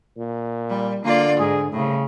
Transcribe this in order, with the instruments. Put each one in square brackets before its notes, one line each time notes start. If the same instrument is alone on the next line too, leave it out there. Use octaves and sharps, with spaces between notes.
[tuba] A#2
[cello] G3
[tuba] D3 [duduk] A#3 [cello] F4 D5
[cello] G#2 [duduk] G#4
[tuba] C2 [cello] A2 [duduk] C#3